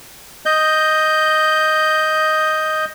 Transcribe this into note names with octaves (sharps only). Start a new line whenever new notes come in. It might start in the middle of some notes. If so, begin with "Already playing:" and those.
D#5 G6